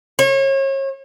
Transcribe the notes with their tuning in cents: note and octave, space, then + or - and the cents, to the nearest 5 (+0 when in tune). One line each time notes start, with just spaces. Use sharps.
C#5 -35